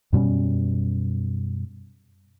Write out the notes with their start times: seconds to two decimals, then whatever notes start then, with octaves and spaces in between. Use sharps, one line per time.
0.13 F#2 B2 G3 C#4